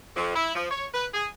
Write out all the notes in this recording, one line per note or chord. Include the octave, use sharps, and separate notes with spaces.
F2
E4
F3
C#5
B4
G#4